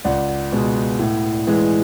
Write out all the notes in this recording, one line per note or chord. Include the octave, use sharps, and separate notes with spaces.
C#2 D5 F#5
B2 G#3
A2
E3 G#3